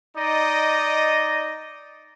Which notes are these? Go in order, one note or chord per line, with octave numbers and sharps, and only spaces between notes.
D#4 D5 D#5